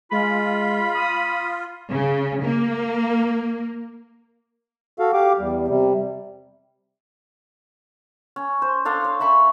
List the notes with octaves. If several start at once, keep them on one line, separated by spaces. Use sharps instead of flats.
G#3 F4 B5
D#6
C#3
A#3
F#4 A4 F5
G4 F5 D6
E2 G3
C3 G3
C#4
C5
D4 A4 F5 C6
C#5
C#4 E5 B5 C#6